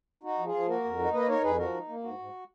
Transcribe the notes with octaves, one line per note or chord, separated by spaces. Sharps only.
D#4 F#4
F3
F4 G#4
F3
A#3 F#4 A#4
F2
D#4
A#3 B4 D#5
D#4 A#4 C#5
F2 G#4 B4
F3 F#4 A#4
D#4
A#3
G#2 F#4
G#2